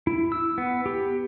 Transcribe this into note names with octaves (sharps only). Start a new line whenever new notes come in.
E4
E6
B3
G4